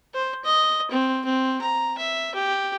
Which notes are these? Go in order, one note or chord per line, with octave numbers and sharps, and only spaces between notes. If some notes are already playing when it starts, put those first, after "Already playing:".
C5
D#5
C4
C4
A#5
E5
G4